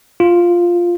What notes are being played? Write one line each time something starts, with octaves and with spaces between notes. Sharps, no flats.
F4